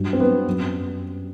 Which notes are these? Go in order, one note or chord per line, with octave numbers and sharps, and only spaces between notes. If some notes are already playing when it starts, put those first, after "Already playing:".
Already playing: G2 F#3
C4
F#3 B3
F#2